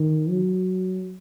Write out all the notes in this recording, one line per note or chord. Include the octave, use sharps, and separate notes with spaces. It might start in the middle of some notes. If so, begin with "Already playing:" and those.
Already playing: D#3
F#3